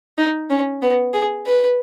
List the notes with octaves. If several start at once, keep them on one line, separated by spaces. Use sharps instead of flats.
D#4
C#4
B3
G#4
B4